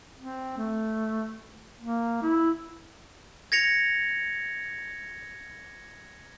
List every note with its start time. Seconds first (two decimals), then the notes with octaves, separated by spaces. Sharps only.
0.17 C4
0.57 A3
1.81 A#3
2.23 E4
3.52 G#6 A#6 C#7 F7